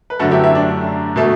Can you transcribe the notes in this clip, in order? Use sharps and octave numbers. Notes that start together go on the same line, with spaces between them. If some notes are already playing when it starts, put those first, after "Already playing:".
B4
F#2 D3 A3 F#4 A4
E4 G4
E4
D4
B2 A3